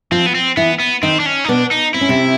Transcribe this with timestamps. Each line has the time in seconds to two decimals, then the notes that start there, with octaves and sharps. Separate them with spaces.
0.12 F3 C4 F4
0.26 B3
0.35 C4
0.57 E3 B3 E4
0.80 B3
1.03 D#3 C4 D#4
1.20 D4
1.26 C#4
1.44 D#4
1.48 B2 B3 D4
1.71 D#4
1.94 C4 E4
2.01 C#4
2.09 C3 C4